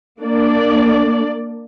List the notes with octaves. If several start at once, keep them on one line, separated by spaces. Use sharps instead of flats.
A#3 D4 D5